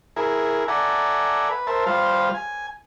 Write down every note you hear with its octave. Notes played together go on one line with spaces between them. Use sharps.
E4 G#4 A#4
A4 D5 E5 F#5 G#5 A#5
B4
A#4 C5 E5 A5
G3 F4 C5 F5
G#5